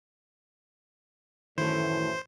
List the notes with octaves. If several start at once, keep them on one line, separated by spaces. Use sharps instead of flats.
F#2 A2 D#3 E3 A3 E4 C5